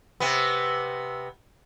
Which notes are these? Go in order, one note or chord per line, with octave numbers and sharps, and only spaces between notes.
C3 B3